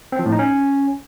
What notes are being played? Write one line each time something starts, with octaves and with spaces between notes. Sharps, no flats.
C4
F3
A2
D#4
C#4